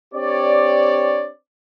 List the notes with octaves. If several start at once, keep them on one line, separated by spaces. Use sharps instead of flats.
C4 D4 G4 C#5 D5